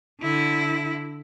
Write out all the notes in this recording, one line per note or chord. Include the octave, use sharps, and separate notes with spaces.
D3 E4